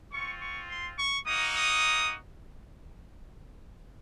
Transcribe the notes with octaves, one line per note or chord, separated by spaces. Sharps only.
C4 F4 C#6
C#6
C6
C#6
A#3 D#4 F#4 D#6
D#6